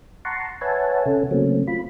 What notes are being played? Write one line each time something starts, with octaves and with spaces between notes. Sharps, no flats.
F#5 A5 A#5 C6 C#6
B4 C#5 E5 F#5 G#5 A5
C3 C#4 A4
C#3 F#3 A3 A#3 C4 C#4
F4 B5